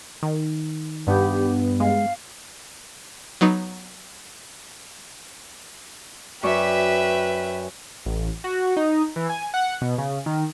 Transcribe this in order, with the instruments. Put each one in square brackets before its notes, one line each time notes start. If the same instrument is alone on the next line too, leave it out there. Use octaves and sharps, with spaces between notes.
[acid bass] D#3
[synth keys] G2 B3 [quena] G4
[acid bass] G#3 [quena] F5
[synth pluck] F#3 B3 D#4
[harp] F#2 D5 C#6 [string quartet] B4 E5 G5
[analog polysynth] A1
F#4
D#4
E3
G#5
F#5
B2
C#3
D#3